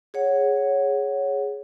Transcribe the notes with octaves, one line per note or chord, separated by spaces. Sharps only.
G#4 C#5 F#5